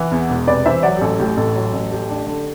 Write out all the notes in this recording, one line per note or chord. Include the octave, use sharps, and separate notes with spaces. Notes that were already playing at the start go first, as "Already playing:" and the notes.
Already playing: E3 F#5
E2
E1
C3 B4 D5
E3 C5 E5
F#3 D5 F#5
G4
A1 A4
A2 G4
A1 A4
F#3
A1
A3 G4
D4
D3